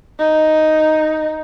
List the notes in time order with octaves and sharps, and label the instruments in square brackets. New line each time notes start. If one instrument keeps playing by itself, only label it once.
[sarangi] D#4